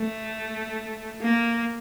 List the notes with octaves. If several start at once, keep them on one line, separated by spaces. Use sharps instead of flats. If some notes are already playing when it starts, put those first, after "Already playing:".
Already playing: A3
A#3